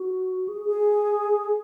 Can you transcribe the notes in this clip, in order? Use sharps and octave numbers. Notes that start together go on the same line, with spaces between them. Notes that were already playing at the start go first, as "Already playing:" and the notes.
Already playing: F#4
G#4
G#4